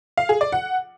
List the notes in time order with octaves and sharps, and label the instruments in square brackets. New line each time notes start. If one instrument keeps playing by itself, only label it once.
[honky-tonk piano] F5
G#4
D5
F#5